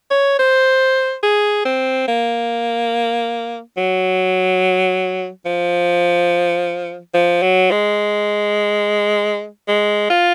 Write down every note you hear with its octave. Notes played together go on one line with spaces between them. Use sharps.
C#5
C5
G#4
C4
A#3
F#3
F3
F3
F#3
G#3
G#3
F4